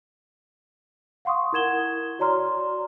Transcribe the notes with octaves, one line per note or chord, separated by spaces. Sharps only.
F5 F#5 C6 C#6 D#6
E4 A#4 G#6 E7 G7
F#4 C#5 D5 A#5 C6 F6